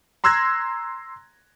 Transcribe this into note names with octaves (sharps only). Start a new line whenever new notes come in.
A#5 C6 E6 F#6 G#6 A#6